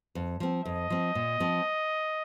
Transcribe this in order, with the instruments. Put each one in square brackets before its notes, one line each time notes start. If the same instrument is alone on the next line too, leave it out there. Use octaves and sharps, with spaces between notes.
[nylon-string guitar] F2
F3 C4
[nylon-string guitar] F2 [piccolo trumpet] D#5
[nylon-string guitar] F3 C4
A#2
F3 C4